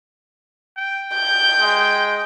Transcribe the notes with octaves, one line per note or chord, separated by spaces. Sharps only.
G5
G6
G#3